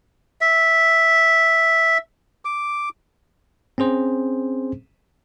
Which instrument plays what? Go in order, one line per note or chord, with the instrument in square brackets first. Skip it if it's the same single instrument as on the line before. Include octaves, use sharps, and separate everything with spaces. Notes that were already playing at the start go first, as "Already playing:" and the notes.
[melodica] E5
D6
[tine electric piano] C4 C#4 G#4 C5